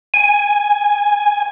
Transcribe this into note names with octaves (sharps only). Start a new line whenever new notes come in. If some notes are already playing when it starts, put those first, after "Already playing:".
G#5